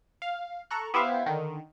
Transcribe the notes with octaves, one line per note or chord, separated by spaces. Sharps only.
F5
A4 A#5 C#6 F#6
B3 E4 G4 C5 E5 F5
D3 D#3